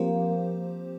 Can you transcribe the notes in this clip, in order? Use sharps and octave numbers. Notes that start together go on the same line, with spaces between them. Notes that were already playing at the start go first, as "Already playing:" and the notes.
Already playing: F3 A#3 C4 G4 C5